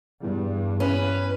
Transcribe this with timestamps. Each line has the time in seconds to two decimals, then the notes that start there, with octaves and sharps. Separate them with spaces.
0.23 E2 G2
0.80 C#4 B4